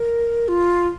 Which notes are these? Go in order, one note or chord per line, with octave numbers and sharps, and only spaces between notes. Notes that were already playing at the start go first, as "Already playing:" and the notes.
Already playing: A#4
F4